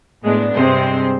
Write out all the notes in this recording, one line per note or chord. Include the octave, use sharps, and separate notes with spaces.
A2 G#3 B3 D4
G2 C3 G#3 C4 C5